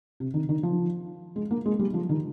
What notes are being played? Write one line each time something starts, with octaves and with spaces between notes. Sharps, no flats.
C3
D#3
D#3
F3
G#3
A#3
G#3
G3
F3
D#3